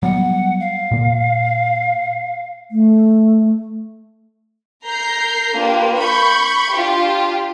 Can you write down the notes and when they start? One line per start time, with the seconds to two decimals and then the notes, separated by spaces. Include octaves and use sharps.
0.03 F#3 G3 B3 F#5
0.60 F5
0.91 A#2 A#3
2.71 A3
4.85 A#4 A#5 G6 C7
5.55 A#3 D4 F4 G4 B4
5.98 B5 C#6 G6
6.74 D4 F4 G4